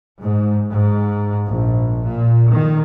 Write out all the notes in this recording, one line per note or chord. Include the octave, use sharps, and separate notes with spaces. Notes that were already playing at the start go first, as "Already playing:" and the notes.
G#2
G#2
A#1
A#2
D#3